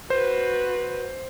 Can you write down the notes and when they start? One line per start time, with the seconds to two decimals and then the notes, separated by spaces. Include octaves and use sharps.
0.10 F#4 B4 C5